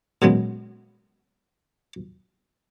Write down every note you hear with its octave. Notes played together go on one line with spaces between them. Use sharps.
A#2 C#3 F#3 G#3 B3